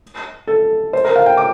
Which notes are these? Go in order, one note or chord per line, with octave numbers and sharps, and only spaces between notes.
A4
C5
A#4
F5
G5
D6